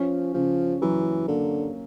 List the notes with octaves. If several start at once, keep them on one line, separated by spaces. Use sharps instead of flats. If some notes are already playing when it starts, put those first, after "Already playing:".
Already playing: F3 C#4
C#3 F3
E3 F#3
D3 A#3